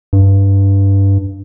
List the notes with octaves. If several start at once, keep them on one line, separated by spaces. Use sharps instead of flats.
G2